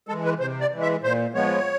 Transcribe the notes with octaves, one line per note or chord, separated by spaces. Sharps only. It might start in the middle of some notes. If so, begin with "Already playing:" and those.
E3 G#3 A4
B4
C3 C5
D5
E3 G#3
E5
A#2 C5
F3 G#3 B3 C#5